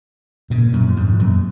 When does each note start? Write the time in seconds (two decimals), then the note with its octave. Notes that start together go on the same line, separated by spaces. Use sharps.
0.50 A#2 C#3
0.73 F#2 A#2
0.96 F2 G#2
1.19 F#2 A#2